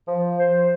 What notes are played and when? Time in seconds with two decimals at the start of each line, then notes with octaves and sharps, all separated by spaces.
0.08 F3
0.39 C5